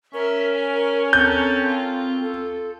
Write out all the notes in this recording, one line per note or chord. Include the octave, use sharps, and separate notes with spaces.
C#4 A#4 E5
G#4 G#5
C4 A4 A#4 G6
F4
A4